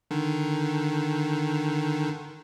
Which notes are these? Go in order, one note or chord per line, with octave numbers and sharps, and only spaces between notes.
D3 D#3